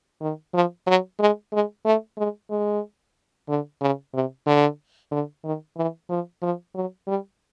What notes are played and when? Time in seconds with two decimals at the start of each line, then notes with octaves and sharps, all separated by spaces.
0.21 D#3
0.54 F3
0.87 F#3
1.19 G#3
1.53 G#3
1.85 A3
2.18 G#3
2.50 G#3
3.49 D3
3.81 C#3
4.14 C3
4.46 D3
5.11 D3
5.44 D#3
5.77 E3
6.10 F3
6.42 F3
6.75 F#3
7.07 G3